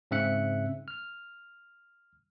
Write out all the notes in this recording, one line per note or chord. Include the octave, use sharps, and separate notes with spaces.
G#2 C#3 C4 E5 F#6 C#7
F6